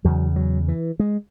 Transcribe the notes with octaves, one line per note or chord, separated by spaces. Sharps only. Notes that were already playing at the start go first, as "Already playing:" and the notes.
E2 C#3 F#3
F#3
E3
G#3